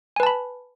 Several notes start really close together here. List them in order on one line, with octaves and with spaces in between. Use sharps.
G#5 B4 A5 B5